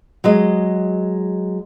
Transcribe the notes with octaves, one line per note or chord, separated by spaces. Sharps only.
F#3 G#3 D#5